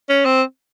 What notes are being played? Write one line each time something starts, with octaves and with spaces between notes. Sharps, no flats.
C#4
C4